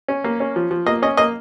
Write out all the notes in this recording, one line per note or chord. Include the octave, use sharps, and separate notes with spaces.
C#4
A#3
C#4
F3
F3
A#3 D#5
C#4 D#5
A#3 D#5